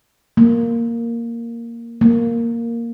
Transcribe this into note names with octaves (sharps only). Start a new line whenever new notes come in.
A#3
A#3